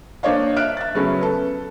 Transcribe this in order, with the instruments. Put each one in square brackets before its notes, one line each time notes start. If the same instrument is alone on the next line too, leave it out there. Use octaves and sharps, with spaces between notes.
[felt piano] A#3 D4 C5 C#5 D#5 F5
E5 F6 F#6 D7
E5 A6
C#3 F#3 A3 B3 C#4
A4 B4